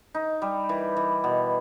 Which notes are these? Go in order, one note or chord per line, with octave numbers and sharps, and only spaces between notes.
D#4
G3
E3
E3
B2